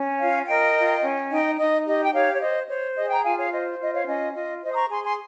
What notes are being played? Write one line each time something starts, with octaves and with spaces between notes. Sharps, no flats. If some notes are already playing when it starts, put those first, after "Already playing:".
Already playing: C#4
F4 C#5 F5
A#4 D#5 G5
F4
C#4
D#4 D#5 G5
D#4 D#5
G4 D#5
G5
G4 C#5 F5
C#5
C5 D#5
C5 C#5
G#4 D#5
G5 A#5
F4 F5 G#5
C#5 F5
C5 D#5
F4 D#5
C#5 F5
C#4 D#5
F4 D#5
C5 D#5
D#6
A#5 C#6
G#4 G#5 C6
G#5 C6